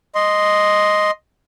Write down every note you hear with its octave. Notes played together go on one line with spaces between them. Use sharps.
D#5 C6